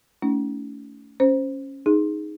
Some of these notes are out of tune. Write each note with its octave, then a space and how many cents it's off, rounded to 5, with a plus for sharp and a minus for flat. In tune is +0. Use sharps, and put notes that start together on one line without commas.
A3 +0 C#4 +30 E4 -40
C#4 -15 C5 +0
D#4 +0 G#4 +0